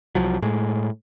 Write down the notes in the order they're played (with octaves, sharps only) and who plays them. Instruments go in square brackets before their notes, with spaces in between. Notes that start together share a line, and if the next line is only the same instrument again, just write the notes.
[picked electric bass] C2 F3 F#3
A2 G#3